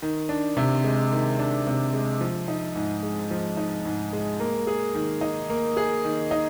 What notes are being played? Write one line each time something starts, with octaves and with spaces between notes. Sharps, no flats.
D#3
D4
C3
G#3
D#3
D4
C3
G#3
F3
D#4
G#2
G#3
F3
D#4
G#2
G#3
A#3
G#4
D#3
D#4
A#3
G#4
D#3
D#4